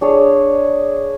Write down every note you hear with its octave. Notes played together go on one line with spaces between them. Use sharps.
D4 G#4 C#5